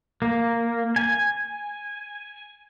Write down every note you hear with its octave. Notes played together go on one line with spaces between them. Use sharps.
A#3
G#5